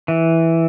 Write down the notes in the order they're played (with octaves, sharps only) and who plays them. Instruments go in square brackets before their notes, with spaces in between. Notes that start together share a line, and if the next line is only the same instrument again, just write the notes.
[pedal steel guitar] E3